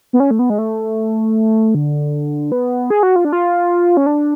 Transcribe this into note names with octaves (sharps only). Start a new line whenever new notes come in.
B3
C#4
A3
B3
G#3
A3
D3
B3
G#4
F#4
F4
D4
F4
C#4
D4